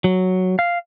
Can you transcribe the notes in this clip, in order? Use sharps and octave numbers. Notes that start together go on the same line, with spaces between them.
F#3
F5